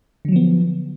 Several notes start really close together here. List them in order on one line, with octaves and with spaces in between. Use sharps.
D3 F#3 F3 B3